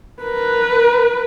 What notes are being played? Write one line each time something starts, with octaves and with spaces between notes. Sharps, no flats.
A#4 B4